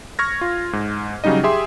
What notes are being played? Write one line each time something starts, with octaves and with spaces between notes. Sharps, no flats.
C#6 F6 G#6 A#6
F4
G#2
C#3 F#3 G3 D#4 D#5
G4 G#4 E5 C6